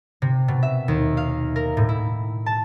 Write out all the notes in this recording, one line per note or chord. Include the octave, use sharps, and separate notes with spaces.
C3
B2
E5
D#2
F5
A#4
A2
E4
A5